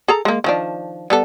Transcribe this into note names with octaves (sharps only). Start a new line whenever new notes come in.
G#4 A4 A#5
G#3 A#3
D#3 F3 D4
G3 B3 A4